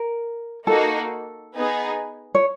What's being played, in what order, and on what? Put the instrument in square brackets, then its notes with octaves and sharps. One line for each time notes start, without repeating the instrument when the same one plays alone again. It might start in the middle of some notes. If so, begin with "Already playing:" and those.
Already playing: [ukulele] A#4
[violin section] A#3 D#4 F#4 A#4 [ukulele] A4
[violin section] B3 D#4 G#4
[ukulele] C#5